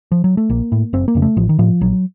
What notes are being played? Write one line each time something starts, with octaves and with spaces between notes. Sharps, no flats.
F3
F#3
A3
A#1 A#3
A2
F#1 C4
A#3
F2 C#3
A3
A1 F3
D#3
A2 F3
A#1 F#3